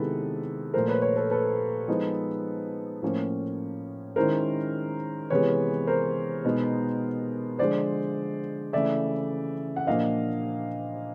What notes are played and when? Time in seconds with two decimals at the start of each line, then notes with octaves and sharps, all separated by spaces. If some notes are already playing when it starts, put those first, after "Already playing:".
Already playing: C3 D#3 G#3 B3 E4 A4 B4
0.74 A#2 F3 A3 A#4 C5
0.88 B4 C#5
1.02 B4 C#5
1.16 A4 B4
1.31 A4 B4
1.88 F3 G#3 B3 D#4
3.03 A2 F3 A#3 C#4
4.16 D#3 G#3 C#4 E4 A#4 C5
5.30 C3 E3 G#3 B3 B4 C#5
5.87 A#4 C5
6.45 B2 G#3 B3 D#4
7.58 D3 F3 G#3 C5 D5
8.73 C#3 E3 A3 D5 E5
9.76 F#5
9.87 A#2 F3 A#3 D4 D#5 F5